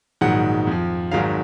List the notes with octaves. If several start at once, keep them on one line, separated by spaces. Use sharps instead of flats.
A#1 G#2 D#3 F#3 F#5
F2 F3
G#1 G#2 D#3 F#3 F5